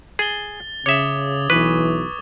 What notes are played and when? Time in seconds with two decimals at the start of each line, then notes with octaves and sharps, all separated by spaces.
0.19 G#4 A6 G7
0.86 C#3 C#5 E5 D6 D#6 G#6
1.50 B1 E3 B4 C#6